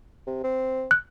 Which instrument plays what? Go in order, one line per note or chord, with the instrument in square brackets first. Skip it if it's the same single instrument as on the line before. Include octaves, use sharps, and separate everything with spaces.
[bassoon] C3
C4
[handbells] F#6